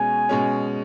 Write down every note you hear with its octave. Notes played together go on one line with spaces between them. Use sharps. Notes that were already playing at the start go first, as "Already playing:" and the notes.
Already playing: B2 G#3 C#4 G#5
B2 G#3 C#4